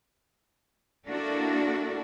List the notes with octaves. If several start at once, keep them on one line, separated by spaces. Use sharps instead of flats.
A#3 D4 E4 F#4 A4 A#4